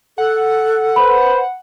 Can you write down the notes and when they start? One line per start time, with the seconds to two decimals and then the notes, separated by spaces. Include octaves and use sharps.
0.18 A4 F#5
0.96 B4 C5 B5